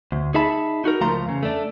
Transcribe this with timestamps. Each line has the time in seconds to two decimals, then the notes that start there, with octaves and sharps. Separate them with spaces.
0.12 D2
0.34 D#4 G#4 E5 A5 B5
0.84 D#4 F#4 G4 A#4
1.01 C#2 F3 A3 F5 A#5 C6
1.26 E2 C#3
1.43 A3 D4